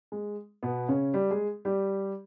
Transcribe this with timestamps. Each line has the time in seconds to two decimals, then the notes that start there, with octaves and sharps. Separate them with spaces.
0.12 G#3
0.63 B2 B3
0.88 C#3 C#4
1.14 G3 G4
1.31 G#3 G#4
1.65 G3 G4